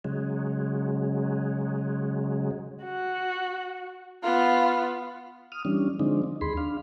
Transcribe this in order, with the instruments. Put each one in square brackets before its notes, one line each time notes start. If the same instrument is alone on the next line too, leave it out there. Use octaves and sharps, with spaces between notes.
[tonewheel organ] C#3 F#3 G#3
[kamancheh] F#4
B3 F4
[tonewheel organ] D#6 F6
E3 G3 C#4 D4
D3 F3 G#3 C4 D4 D#4
D#4
D#2 G#4 B5 C6
D4 F5